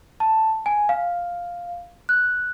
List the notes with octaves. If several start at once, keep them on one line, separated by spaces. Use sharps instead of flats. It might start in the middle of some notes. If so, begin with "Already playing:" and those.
A5
G#5
F5
F#6